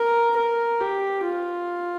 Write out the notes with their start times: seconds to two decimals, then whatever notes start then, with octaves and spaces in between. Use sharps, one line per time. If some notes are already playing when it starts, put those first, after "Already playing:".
Already playing: A#4
0.36 A#4
0.81 G4
1.25 F4